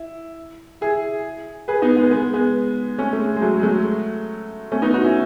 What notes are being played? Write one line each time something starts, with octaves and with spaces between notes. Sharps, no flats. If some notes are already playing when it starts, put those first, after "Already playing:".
Already playing: E4
E4 G#4
G#4 B4
B3 D#4
G#3 B3
G#3 B3
G#3 B3
A3 C#4
A3
G#3
G#3
F#3 A3
G#3
F#3 A3
A3 C#4
B3 D#4
D#4 F#4
C#4 E4